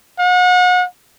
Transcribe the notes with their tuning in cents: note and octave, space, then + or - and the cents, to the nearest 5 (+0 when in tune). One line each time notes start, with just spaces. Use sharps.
F#5 -35